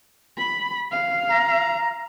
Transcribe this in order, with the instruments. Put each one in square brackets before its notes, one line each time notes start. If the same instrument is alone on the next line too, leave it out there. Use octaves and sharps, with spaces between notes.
[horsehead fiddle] B5
F5
[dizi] A#5